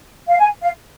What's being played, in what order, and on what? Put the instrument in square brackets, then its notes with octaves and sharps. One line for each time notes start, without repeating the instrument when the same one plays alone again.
[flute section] F5
G#5
F5